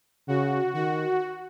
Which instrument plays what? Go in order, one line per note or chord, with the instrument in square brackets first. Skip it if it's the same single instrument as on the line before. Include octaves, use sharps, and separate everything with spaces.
[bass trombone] C#3 [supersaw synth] F#4
[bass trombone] D#3 [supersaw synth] F#4